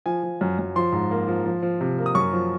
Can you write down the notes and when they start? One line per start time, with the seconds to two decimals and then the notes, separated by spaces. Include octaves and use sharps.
0.06 F3 G#5
0.23 F3
0.41 F#2
0.59 F#2
0.76 F3 C6
0.92 G#2
1.11 A#3
1.28 F3
1.45 F3
1.62 F3
1.81 C3
1.98 A#3
2.06 D#6
2.15 F#2 C#6
2.33 F3